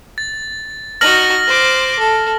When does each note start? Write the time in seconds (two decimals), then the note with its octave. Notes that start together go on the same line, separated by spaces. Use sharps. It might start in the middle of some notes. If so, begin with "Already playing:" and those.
0.18 A6
1.01 D#4 F#4 F6 A#6 F#7
1.47 C5 D6
1.99 A4